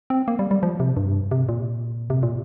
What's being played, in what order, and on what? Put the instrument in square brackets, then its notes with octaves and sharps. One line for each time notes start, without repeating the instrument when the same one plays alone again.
[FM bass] C4
A#3
G3
G3
F3
C3
G2
C3
A#2
C3
A#2